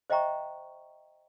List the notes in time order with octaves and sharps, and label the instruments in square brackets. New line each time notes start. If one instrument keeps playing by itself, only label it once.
[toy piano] C5 D#5 E5 G5 A#5 C#6